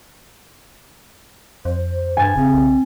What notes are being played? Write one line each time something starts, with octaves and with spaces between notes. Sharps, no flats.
F2 C5
G2 G#5 A6
E1 C#3 C4
B1